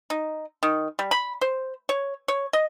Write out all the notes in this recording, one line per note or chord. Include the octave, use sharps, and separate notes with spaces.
D#4
D#3
G3
B5
C5
C#5
C#5
D#5